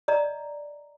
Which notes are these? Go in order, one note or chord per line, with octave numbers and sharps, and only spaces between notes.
D5 D#5 A#5